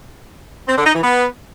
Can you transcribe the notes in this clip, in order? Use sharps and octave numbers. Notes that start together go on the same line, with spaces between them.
C4
D3
D#4
E3
B3